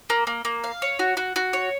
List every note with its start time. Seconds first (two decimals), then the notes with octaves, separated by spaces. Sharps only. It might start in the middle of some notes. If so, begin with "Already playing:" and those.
0.10 A#3
0.27 A#3
0.45 A#3
0.64 F5
0.82 C#5
0.99 F#4
1.17 F#4
1.36 F#4
1.53 C#5